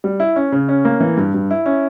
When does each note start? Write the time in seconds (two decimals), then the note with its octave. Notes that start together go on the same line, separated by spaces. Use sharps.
0.04 G3
0.20 E4
0.36 C#4
0.52 C#3
0.68 C#4
0.85 A#3
1.00 E3
1.17 G2
1.34 G2
1.51 E4
1.66 C#4